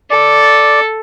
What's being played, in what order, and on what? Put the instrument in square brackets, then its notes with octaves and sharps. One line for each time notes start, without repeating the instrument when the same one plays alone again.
[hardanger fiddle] A4 [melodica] D5